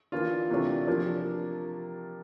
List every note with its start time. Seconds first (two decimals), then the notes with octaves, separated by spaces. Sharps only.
0.12 E3 A#3 D4 F4
0.50 C3 E3 A3 D4
0.87 C3 F3 A#3 D4